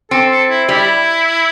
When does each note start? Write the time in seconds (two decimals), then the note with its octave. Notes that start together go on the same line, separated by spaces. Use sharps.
0.11 C4 A4
0.31 A4
0.50 E4
0.69 G3 E4